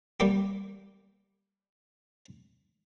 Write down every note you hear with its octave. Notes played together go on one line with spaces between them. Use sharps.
G3 A#3 G4